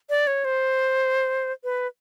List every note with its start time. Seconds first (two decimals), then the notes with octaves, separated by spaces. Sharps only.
0.10 D5
0.27 C#5
0.45 C5
1.64 B4